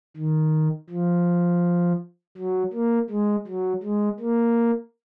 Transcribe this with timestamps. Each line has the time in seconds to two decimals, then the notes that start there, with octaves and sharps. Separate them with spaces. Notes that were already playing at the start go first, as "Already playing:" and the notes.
0.17 D#3
0.90 F3
2.37 F#3
2.74 A#3
3.10 G#3
3.47 F#3
3.83 G#3
4.20 A#3